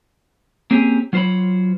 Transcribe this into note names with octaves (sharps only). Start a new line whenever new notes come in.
A#3 C4 C#4 G4 G#4
F#3 F4 C5 C#5 B5